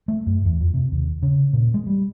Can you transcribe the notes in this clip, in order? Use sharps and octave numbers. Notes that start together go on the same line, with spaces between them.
A3
F#2
E2
F2
C3
D#2
C#3
A#2
G#3
G3